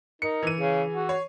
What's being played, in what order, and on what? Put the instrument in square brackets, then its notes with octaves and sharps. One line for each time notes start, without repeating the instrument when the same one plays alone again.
[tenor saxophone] D#4 [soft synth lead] A#4 [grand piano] C#7
[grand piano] E3 D#7
[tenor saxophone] C#3 [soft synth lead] G#4
[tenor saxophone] F#4
[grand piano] C#5 [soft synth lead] C7